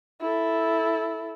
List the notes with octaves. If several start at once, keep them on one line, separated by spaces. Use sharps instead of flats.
E4 A4